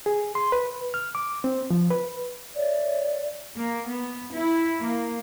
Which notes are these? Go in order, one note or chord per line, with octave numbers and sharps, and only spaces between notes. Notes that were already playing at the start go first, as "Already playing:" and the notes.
G#4
C6
B4
F6
D6
C4
F3
B4
C#5 D5 E5
A#3
B3
E4
A#3